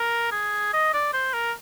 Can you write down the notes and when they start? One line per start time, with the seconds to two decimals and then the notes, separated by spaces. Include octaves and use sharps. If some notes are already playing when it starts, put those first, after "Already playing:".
Already playing: A#4
0.32 G#4
0.73 D#5
0.94 D5
1.13 C5
1.34 A#4